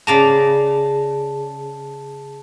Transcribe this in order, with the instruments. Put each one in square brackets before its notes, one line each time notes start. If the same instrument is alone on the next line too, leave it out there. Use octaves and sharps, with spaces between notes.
[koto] C#3 D5 A#5 [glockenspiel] A5